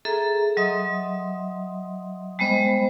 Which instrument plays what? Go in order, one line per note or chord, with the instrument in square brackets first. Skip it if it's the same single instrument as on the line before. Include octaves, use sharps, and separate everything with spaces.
[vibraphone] G#4 A4 E5 A#5
F#3 D#5 E5 C6 D#6
G3 G#3 B3 C5 D#5 B5